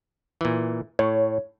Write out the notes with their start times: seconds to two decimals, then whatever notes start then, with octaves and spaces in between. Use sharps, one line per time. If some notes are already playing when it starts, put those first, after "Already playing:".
0.41 A#2 E3
0.99 A2 C#5